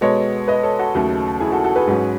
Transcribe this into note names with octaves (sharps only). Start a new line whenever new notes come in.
B2 G#3 B3 A4 C#5
B4 D#5
A4 C#5
F#4 A4
D#2 C#3 F#3 A3
E4 G#4
F#4 A4
F#4 A4
G#4 B4
G#2 F#3 C#4